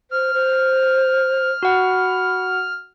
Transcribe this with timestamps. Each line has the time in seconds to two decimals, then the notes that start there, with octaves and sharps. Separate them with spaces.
0.11 C5 F6
0.34 C5
1.63 F#4 F#5 B5